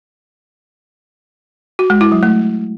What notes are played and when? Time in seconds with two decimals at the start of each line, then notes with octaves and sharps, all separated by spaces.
1.79 F#4
1.90 G#3
2.01 E4
2.12 F#3
2.23 A3